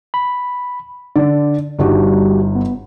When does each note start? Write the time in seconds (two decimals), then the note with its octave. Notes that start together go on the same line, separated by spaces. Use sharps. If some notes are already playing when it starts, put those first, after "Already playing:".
0.14 B5
1.16 D3 D5
1.79 G1 G3 D4 D#4 F#4 G4
2.55 B3